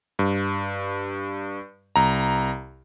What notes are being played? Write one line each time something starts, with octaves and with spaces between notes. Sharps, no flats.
G2
C2 A#5